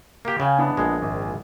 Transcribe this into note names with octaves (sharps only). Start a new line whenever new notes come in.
A#3 G4
C#3 F5 G5 G#5
B3 D4 E4
A#1 G#3
G#1